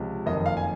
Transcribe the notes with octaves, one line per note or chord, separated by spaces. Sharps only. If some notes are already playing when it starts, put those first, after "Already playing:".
Already playing: C#2 C3 F3 G#3
F#1 F2 D#3 D#5
F5
G#5